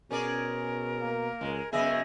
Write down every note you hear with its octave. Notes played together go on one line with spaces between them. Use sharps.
B2 C#4 G#4 A#4 D5
A#3
C#2 G#3
F#2 C#3 B3 G#4 D#5 E5